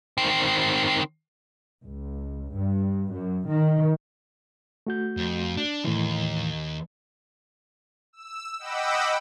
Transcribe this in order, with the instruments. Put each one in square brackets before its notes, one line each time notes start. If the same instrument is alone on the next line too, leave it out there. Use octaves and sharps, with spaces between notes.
[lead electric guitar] D#3 C4
[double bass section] C#2
G2
F#2
D#3
[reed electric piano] A3 F#4 G6
[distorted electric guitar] F2
D4
[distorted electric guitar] D#2 [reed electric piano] A2 E3
[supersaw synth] E6
D#5 F#5 G5 B5 D6 E6